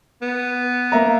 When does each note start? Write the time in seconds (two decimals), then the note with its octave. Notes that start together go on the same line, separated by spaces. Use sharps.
0.22 B3
0.92 A#3 E5 A#5